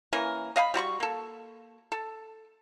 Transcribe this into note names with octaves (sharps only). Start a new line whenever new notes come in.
E3 A#3 C#4 A#4
D#5 F5 G5 B5
G3 F#4 B5 C#6
A#3 A4
A4